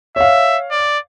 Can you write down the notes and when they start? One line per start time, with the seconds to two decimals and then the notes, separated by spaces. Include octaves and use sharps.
0.16 C#5 E5 F5
0.71 D5